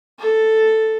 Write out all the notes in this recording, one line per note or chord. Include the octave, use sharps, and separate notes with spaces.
A4